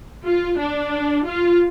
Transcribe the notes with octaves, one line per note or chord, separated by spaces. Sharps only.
F4
D4
F4